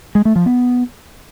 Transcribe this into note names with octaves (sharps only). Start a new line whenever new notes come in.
G#3
A3
F3
B3